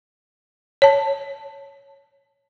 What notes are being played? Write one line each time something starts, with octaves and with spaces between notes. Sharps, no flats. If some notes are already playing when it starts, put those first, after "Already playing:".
C#5 A5